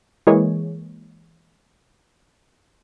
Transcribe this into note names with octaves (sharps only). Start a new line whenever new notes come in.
E3 G#3 A#3 G#4 C#5